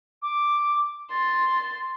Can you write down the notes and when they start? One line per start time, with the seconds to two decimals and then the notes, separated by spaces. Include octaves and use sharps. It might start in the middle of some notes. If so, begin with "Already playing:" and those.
0.22 D6
1.11 C6 A6